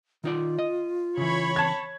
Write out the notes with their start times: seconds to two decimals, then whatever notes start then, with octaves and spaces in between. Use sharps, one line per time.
0.24 D#3 D#4 F4 D5
0.59 D#5
1.17 C#3 E3 C#5 B5
1.56 A5 G#6